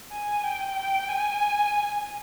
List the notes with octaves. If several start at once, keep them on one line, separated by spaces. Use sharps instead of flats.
G#5
G5
G5
G#5